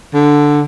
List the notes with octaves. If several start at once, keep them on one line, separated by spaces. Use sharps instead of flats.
D3